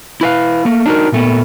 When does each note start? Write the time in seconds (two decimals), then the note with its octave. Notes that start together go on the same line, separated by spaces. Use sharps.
0.21 E4 B4 F5
0.65 A3 A#3
0.86 D4 D#4 F4 F#4 A#4
1.12 A#2 A3 B3